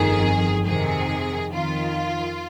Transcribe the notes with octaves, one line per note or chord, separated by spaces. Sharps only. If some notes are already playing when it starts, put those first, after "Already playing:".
Already playing: G1 F2 D#3 G#4
F2 C3 D#3 G#4
F2 D#3 F4